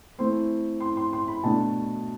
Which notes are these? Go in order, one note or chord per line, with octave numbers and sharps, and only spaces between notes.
E3 A3 C4 E4 C6
C6
C6
C6
B5
B2 A3 D4 A5